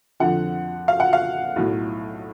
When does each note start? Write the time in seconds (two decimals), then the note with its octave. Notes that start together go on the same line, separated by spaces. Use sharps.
0.20 F2 D3 F3 F#5
0.88 F5
1.00 F#5
1.13 F5
1.56 B1 A2 F#3